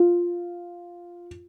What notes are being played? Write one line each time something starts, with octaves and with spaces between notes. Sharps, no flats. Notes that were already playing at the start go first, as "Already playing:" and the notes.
Already playing: F4